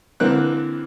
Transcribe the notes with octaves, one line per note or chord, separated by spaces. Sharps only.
D3 E3 A#3 C4 F#6